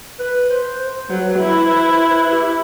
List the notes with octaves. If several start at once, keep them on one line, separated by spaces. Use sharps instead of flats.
B4
C5
C5
F#3 B4
E4
C5
B4
C5
B4
G4